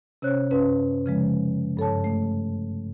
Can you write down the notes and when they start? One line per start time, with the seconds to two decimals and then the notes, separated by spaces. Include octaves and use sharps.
0.22 C3 C#4 C5 C#5 F#6
0.50 F#2 C#4 B4
1.06 C#3 F3 G#3
1.77 G2 A4 C#5 A5
2.04 A3